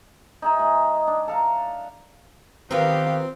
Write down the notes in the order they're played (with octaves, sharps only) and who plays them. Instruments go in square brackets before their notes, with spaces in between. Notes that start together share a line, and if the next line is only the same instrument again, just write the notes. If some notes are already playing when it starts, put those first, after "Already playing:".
[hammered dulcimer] D#4 G#4 E5
G#3
D4
A4 F5 A#5
[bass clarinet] D#3 [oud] B3 F4 A#4 [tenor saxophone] C4 [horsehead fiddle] G4 F5